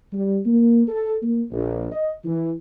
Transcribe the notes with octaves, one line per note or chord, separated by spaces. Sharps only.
G3
A#3
A4
A#3
A#1
D#5
E3